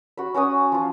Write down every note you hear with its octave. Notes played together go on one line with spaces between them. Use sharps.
F#4 B5
C#4 F#4 G#5 D#6
F3 F4